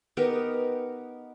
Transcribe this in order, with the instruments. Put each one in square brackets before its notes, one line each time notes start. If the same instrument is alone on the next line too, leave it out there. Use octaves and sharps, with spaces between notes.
[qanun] B3 D#4 G4 A#4